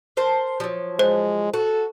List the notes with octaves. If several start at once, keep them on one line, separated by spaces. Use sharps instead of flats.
A#4 C5 A5
F3 F#3
G#3 C5
F#4 A4